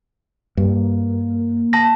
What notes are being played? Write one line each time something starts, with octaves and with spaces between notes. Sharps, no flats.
G2 A#3
A5 A#6